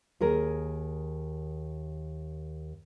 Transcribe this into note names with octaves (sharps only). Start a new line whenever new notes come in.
D#2 G#4 A#4